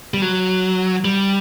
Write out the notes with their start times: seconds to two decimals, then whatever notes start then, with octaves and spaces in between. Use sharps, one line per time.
0.14 G3
0.22 F#3
1.05 G3